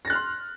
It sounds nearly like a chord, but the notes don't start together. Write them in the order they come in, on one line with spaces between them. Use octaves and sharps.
A#6 A6 F#6 F6 C6